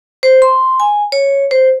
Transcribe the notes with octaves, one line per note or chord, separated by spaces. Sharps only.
C5
C6
G#5
C#5
C5